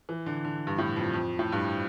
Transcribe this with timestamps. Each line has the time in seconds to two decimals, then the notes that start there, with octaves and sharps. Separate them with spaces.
0.09 E3
0.26 D3
0.45 D3
0.67 G2
0.78 A2
0.96 F2
1.13 F2
1.39 A2
1.52 G2